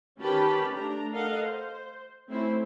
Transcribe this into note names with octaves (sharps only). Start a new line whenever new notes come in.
D#3 C#4 G4 B4 A5 B5
A3 D4 A#5
A4 A#4 D#5 F5 F#5
C5
A3 C4 C#4 E4 C5